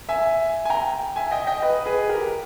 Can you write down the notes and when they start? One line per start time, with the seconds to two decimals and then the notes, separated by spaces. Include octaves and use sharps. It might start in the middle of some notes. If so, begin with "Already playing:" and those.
0.09 E5 G#5
0.65 G#5
0.70 G5 A#5
1.16 E5 G#5
1.31 D#5 G5
1.47 D#5 G5
1.62 B4 D#5
1.86 G#4 B4
2.09 G4 A#4